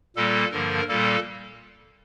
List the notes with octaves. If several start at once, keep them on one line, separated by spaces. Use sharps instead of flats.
A#2 G3 A#3 A4
G2 D3 F3 A#3 A#4
A#2 G3 A#3 A4